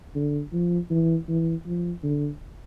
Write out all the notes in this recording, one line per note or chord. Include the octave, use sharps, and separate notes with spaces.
D3
F3
E3
E3
F3
D3